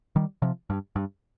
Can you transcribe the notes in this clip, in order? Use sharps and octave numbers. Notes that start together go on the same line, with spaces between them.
D#3 G3
C3 F3
G2
G2